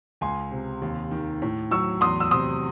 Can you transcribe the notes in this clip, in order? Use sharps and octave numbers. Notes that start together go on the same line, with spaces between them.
C#2 G#5 C6
C3
D#2
D#3
A2
F#3 C#6 E6
E2 C6 D#6
E6
C3 C6 D#6